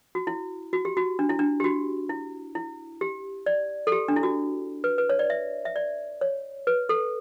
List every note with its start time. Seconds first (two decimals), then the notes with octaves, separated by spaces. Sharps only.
0.15 F#4
0.27 E4
0.73 F#4
0.85 G4
0.97 F#4
1.19 D4
1.29 E4
1.39 D4
1.60 G4
1.64 F#4
2.10 E4
2.55 E4
3.01 G4
3.46 D5
3.87 A4
3.92 G4
4.08 D4
4.16 E4
4.23 F#4
4.84 B4
4.98 B4
5.10 C#5
5.19 D5
5.30 E5
5.65 E5
5.76 D5
6.21 C#5
6.67 B4
6.89 A4